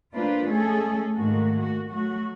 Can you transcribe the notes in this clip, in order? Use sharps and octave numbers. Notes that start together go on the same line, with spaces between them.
A#3 D4 F4 B4 C5
G#3 A3 C#4 G#4 A4
G#2 D#3 A3 A#3 F#4
F#4
F#3 A3 F#4